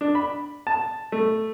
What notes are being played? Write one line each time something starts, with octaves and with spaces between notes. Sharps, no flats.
D4
B5
A5
A3